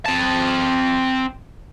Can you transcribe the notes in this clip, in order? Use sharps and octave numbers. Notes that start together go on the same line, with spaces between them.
C4 A5